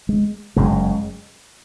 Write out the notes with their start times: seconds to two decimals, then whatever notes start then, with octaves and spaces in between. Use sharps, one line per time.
0.09 G#3
0.56 F#1 F#2 C#3 G#3